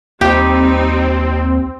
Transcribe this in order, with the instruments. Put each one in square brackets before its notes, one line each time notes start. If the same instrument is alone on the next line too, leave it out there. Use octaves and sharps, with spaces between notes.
[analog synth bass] D#2 [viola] G3 D#4 [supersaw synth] C4 [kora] G4